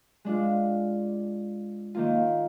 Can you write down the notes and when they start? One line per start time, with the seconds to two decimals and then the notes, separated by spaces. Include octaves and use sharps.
0.25 G#3 D4 F4
1.95 D#3 A#3 F4